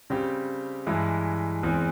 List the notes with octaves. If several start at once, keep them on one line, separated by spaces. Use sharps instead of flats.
C#3 G3 C4 G4
G2 E3 G#3 E4
E2 E3 G#3 C4